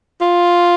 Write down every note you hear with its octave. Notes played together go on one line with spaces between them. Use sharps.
F4